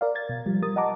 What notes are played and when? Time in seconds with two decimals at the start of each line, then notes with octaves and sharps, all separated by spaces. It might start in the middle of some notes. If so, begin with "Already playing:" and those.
0.01 A#4 D5 F5
0.15 G#6 A6
0.29 B2
0.46 F3 G3
0.62 G3 A#4 D#6 A6
0.76 D#5 F#5 A5 A#5 D6